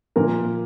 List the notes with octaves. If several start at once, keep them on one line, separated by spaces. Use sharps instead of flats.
A#2 F3 A#4